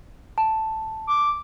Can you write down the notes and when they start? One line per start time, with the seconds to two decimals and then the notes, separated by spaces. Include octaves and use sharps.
0.38 A5
1.07 D6